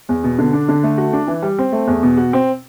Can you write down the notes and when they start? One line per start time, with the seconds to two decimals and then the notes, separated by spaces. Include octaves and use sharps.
0.09 E2
0.24 B2
0.39 D3
0.53 D4
0.69 D3
0.83 A3
0.98 F#4
1.13 D4
1.27 E3
1.42 G3
1.58 C4
1.72 A3
1.87 E2
2.03 B2
2.17 F#4
2.33 C4